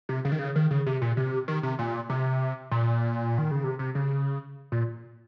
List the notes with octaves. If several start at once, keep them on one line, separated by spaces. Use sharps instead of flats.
C3
C#3
D#3
C#3
D#3
C#3
C3
A#2
C3
D#3
C3
A#2
C3
A#2
D#3
C#3
C3
C3
C#3
A#2